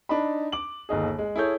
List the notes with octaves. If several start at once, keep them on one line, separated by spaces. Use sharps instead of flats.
D4 D#4 B5
D6 F#7
G1 D#2 D#4 G#4
G#3
E4 G#4 A4 C#5 G6